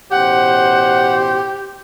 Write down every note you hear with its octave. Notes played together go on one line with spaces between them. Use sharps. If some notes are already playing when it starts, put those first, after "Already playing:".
A1 B2 G4 C5 F#5